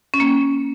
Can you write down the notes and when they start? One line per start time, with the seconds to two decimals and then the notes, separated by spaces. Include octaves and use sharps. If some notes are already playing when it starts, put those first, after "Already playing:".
0.14 C#4
0.20 A#3